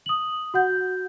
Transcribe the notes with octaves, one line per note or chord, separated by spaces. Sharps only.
D#6 F#7
F#4 F#5 G6